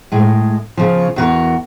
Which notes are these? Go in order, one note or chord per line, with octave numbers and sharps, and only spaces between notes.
A2 G#3
C#3 F3
E2 F#4 A#4